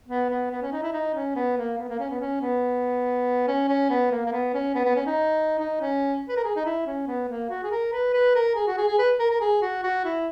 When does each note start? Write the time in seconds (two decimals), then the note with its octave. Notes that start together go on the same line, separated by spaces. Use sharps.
0.08 B3
0.29 B3
0.51 B3
0.61 C#4
0.72 D#4
0.82 E4
0.93 D#4
1.14 C#4
1.35 B3
1.57 A#3
1.78 B3
1.88 A#3
1.99 C#4
2.09 B3
2.20 C#4
2.41 B3
3.47 C#4
3.68 C#4
3.90 B3
4.11 A#3
4.26 A#3
4.32 B3
4.54 C#4
4.75 B3
4.85 B3
4.96 C#4
5.06 D#4
5.59 D#4
5.81 C#4
6.28 B4
6.36 A#4
6.44 G#4
6.56 D#4
6.65 E4
6.86 C#4
7.07 B3
7.29 A#3
7.50 F#4
7.63 G#4
7.71 A#4
7.92 B4
8.13 B4
8.35 A#4
8.55 G#4
8.67 F#4
8.77 G#4
8.88 G#4
8.98 B4
9.19 A#4
9.30 A#4
9.41 G#4
9.62 F#4
9.83 F#4
10.04 E4